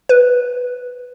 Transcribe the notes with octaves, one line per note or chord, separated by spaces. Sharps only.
B4